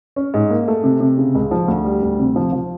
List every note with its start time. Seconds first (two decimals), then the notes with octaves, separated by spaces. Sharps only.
0.16 C#4
0.34 G#2
0.50 A#3
0.68 A3
0.83 C3
1.00 C3
1.18 C#3
1.35 C#2
1.51 F3
1.68 D2
1.85 G3
2.02 D2
2.19 C3
2.36 F3
2.53 F3